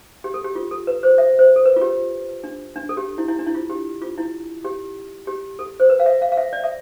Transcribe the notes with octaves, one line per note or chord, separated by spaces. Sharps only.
G4
A4
G4
F4
A4
B4
C5
E5
C5
A4
B4
F4
G4
D4
D4
A4
G4
E4
E4
D4
E4
F4
G4
F4
E4
G4
G4
A4
C5
B4
F5
E5
F5
F5
E5
D5
E5